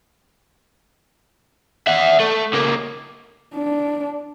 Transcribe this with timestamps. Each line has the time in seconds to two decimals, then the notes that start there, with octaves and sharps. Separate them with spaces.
1.87 E5 F#5
2.20 A3
2.53 C#2 A#3
3.55 D4